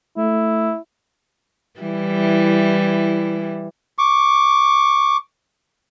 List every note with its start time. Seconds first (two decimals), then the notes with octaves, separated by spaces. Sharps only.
0.17 A3 E4
1.80 E3 G3 E4
3.98 C#6 D6